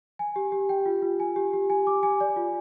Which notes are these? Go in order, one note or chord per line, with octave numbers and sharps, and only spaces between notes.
G#5
G4
G4
G5
F4
F4
G#5
G4
G4
G#5
D6
G#5
D5
F4